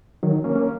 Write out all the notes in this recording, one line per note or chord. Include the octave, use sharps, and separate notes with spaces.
D#3 F#3
A#3 C#4
A#3 C#4